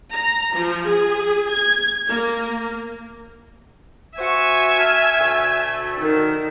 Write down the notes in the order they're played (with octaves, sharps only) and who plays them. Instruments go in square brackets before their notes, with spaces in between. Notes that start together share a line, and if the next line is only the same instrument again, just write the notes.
[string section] A#5
F3
G#4
G#6
A#3
[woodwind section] F#4 C5 C#6 [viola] E5 G#5
[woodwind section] A5 F6
D2 B2 A3
[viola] D#3